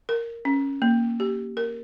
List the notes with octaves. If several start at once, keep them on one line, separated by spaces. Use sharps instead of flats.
A#4
C#4
A#3
G4
A#4